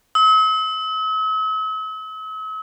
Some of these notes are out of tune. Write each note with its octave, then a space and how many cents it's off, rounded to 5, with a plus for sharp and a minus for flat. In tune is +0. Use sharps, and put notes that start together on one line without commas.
E6 -45